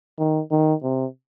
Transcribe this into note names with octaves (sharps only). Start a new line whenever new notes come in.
D#3
D#3
C3